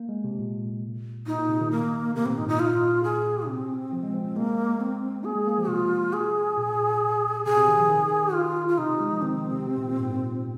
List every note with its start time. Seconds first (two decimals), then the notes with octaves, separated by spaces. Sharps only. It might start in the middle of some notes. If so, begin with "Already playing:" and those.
Already playing: A#3
0.09 G#3
0.24 C3
0.39 A#2
1.27 A#2 D#4
1.38 A#2
1.49 C3
1.61 D#3
1.71 A#3
2.15 C3 A#3
2.26 A#2 C4
2.37 G#2 D#4
2.48 A#2 D#4
2.59 F4
3.03 G#4
3.47 C3 C4
3.93 F3
4.03 G#3
4.14 F3
4.36 G#3 A#3
4.80 C4
5.24 A#3 G#4
5.36 G#3
5.47 A#3
5.58 F3
5.68 C3 F4
6.13 G#4
6.57 A#2
7.45 C3 G#4
7.57 C3
7.68 D#3
7.78 F3
7.90 D#3
8.33 F4
8.68 F4
8.78 C3 D#4
8.89 C3
9.00 G#3
9.11 F3
9.22 D#3 C4
9.51 C3
9.67 C3
9.77 A#2
9.88 A#2
10.00 G#2
10.11 A#2